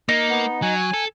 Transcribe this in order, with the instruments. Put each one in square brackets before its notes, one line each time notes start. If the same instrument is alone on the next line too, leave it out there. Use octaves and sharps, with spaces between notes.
[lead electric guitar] A#3 [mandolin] D#4
[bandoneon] B3
[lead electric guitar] F#3 [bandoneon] G#5
[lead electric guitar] A4